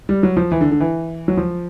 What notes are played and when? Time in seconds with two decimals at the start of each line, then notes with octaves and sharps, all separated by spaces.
0.09 G3
0.23 F#3
0.37 F3
0.52 E3
0.61 D3
0.71 D3
0.80 E3
1.28 F#3
1.37 F3